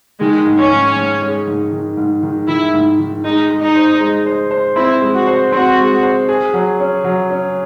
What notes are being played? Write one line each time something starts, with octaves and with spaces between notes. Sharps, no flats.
D#3 G#3
G#2
C#4
G#2
G#2
G#3
G#2
D#3
G#2
D#3
D#3 E4
G#2
D#3
G#3 D#4
G#3
D#4
C5
G#3
C5
C5
C4 E4
G#3
F#4
C5
C4 F#4
G#3
C5
G#4
F#3
C#4
F#3
C#4